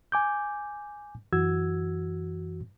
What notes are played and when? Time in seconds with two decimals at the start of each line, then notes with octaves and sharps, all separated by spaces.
0.12 G#5 D6 G6
1.33 F#2 E3 F#4 E6 G#6